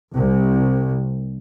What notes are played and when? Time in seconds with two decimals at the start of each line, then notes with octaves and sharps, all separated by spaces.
0.13 C2